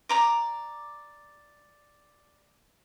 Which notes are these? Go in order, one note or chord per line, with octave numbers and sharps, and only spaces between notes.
D5 A#5 D6